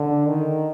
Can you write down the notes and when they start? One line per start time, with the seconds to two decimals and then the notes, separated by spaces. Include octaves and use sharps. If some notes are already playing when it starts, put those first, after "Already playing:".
Already playing: D3
0.28 D#3